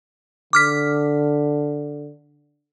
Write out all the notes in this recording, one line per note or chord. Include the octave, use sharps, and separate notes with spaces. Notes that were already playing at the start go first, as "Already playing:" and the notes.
D3 D6 F6 B6